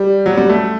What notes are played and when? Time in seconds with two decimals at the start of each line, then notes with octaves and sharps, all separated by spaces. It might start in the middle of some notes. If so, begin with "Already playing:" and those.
Already playing: G3
0.26 F#3
0.37 G3
0.49 A3